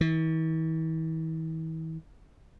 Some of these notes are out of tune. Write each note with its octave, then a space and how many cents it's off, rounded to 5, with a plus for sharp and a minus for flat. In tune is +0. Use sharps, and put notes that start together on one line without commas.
E3 -40